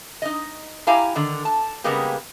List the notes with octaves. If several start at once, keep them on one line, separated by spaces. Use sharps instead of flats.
D#4 D#5
E4 G4 F5 G#5 A#5
D3 D#3
A5
C#3 G3 G#3 A#3 B3 G4